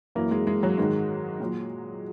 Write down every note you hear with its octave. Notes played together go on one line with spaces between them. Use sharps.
F#2 E3 A#3
G#3
G#3
F#3
G#2 D#3 F#3 G#3
A#2 F#3